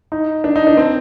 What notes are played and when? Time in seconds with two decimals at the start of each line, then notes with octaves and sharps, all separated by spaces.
0.12 D#4
0.44 D4
0.56 D#4
0.67 D4
0.77 C4